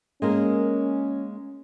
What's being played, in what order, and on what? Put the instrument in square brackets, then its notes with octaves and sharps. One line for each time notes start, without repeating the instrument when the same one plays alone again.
[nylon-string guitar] G#3 A#3 A#4 [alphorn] C#4